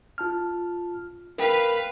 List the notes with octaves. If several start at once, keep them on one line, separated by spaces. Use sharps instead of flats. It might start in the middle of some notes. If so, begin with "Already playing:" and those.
F4 A5 F6
A#4 B4 F5 G5